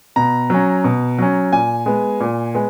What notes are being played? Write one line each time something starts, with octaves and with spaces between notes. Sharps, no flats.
B2 A#5
F#3 C#4
B2
F#3 C#4
A#2 G#5
G#3 B3
A#2
G#3 B3